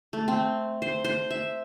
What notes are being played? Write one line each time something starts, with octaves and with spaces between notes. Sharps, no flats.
A3
C4
C5
C5
E5